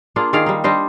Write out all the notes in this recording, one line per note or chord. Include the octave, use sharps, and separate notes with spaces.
A#3 D4 F4 G#4
D#3 G#4 D5 F5
G3 D#4
G3 D4 C5 D#5